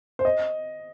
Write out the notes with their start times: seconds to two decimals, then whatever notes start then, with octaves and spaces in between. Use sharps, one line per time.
0.19 C5
0.25 D#5